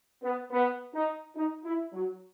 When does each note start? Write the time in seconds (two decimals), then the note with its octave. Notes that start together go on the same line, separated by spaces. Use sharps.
0.22 B3
0.51 B3
0.93 D#4
1.35 D#4
1.64 E4
1.93 F#3